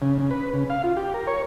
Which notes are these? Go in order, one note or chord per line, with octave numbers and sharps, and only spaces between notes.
C#3
C#3
B4
C#3
F5
F4
G4
A#4
C#5